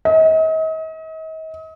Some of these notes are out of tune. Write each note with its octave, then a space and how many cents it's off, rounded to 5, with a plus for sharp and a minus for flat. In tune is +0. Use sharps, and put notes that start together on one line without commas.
D#5 +40